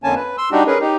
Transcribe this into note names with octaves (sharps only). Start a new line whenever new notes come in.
F2 D3 A#3 C#4 G#5 A5
B4
C6 E6
G3 D4 D#4 F#4 G4
C#4 G#4 A#4 B4
D#4 G4